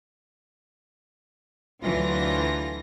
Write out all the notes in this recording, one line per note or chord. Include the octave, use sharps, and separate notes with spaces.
D2 D3 E3 F#3 F4 A#6